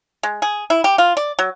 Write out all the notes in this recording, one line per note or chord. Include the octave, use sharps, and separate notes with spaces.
G#3
G#4
E4
G4
F4
D5
F#3